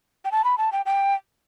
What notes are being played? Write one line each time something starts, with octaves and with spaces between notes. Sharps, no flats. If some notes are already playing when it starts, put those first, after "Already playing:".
G5
A5
B5
A5
G5
G5